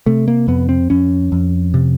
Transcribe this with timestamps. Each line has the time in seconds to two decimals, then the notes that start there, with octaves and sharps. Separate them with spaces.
0.06 C3 A3
0.28 A#3
0.48 F2 B3
0.69 C4
0.90 F2 C#4
1.32 F2
1.74 C3